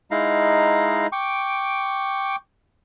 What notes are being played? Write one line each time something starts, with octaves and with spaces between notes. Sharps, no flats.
G#3 D#4 E4 F5 A#5
G5 C#6 D6